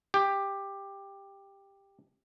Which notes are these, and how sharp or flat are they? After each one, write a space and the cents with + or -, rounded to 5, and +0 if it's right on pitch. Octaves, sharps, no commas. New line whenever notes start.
G4 +10